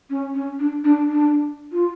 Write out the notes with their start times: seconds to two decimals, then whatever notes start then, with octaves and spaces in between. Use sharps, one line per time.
0.10 C#4
0.34 C#4
0.59 D4
0.84 D4
1.10 D4
1.72 F4